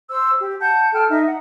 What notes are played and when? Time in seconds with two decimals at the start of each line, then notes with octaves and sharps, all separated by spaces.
0.09 C5 E6
0.41 G4
0.61 F#5 A5 G6
0.93 A4 G5 A5 F6
1.08 D#4 E5
1.27 F#5